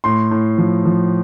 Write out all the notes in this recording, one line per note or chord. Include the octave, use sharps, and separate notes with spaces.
A2 C6
A2
F3
F3